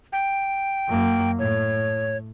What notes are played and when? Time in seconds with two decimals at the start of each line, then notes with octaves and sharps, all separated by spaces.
0.12 G5
0.89 F#2 A#3
1.39 A2 C#5